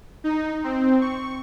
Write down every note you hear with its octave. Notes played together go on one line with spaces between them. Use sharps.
D#4
C4
C#6